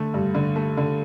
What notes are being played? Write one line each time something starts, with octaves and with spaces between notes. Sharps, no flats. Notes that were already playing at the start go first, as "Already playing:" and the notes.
Already playing: D3 A3
G2
D3
A3
D3